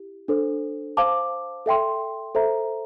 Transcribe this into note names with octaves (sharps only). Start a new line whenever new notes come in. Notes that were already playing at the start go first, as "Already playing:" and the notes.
Already playing: E4 G4
D4 A4 C5
C5 F5 A5 D6
A4 E5 G5 C6
A4 C5 E5 A#5